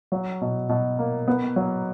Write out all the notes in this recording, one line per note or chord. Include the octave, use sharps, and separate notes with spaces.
F#3
B2
B2
A#3
B3
F#3